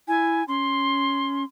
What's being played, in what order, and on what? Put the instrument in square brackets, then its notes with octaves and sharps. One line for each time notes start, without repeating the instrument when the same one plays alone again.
[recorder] E4 [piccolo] G#5
[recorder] C#4 [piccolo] C6